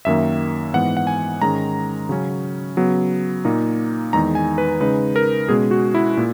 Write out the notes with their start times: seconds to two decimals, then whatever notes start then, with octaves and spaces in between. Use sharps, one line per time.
0.05 F#2 D#3 A#3 E5
0.74 G#2 E3 B3 F#5
0.97 F#5
1.07 G#5
1.42 G#2 D#3 G#3 C#4 A#5
2.09 C#3 F#3 C#4
2.77 C#3 F#3 B3
3.45 A#2 A#3 D#4
4.13 E2 D#3 G#3 D#4 A#5
4.35 G#5
4.58 B4
4.80 C#3 G#3 D#4 B4
5.16 A#4
5.48 B2 G#3 C#4 G#4
5.71 F#4
5.95 E4
6.17 A#2